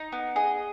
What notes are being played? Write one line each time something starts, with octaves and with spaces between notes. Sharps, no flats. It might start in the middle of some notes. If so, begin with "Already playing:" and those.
Already playing: D#4
B3
G#4 D#5